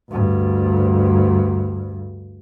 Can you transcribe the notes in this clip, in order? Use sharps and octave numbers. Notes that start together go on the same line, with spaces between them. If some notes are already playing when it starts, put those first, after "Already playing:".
D2 G2